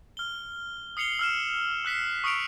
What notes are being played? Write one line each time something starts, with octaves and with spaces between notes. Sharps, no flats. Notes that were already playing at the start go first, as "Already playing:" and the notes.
F6 G7
D#6 C7 C#7 F7 G7
E6 F6 E7
E6 F#6 B6 C7
C#6 D#6 F6 C#7 D7 F7